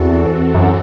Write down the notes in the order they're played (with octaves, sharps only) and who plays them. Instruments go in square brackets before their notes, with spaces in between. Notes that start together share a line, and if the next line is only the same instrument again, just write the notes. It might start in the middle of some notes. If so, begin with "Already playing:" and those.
Already playing: [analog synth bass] E2 [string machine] E3 C4 F#4 A4
[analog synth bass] F#2